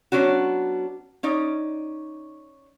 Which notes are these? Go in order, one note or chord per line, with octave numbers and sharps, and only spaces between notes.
F#3 B3 C#4 D4 F#4
C#4 D#4 D5